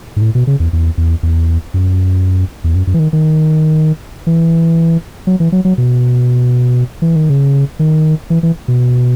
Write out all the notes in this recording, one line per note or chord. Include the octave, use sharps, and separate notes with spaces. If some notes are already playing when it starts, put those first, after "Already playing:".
G#2
A2
B2
C#3
E2
E2
E2
E2
F#2
E2
F#2
F#2
E3
D#3
D#3
E3
F#3
E3
F#3
F#3
B2
E3
D#3
C#3
D#3
E3
E3
B2